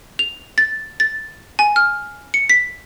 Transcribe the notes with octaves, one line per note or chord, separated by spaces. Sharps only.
F7
A6
A6
G#5
F6
C#7
B6